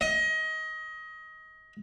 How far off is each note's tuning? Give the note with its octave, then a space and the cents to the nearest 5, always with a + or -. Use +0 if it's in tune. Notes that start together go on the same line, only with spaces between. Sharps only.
D#5 +25